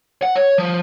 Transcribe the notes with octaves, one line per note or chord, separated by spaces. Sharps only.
F#5
C#5
F3